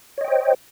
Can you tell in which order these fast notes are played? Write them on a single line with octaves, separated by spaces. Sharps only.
C#5 D#5 G5 C5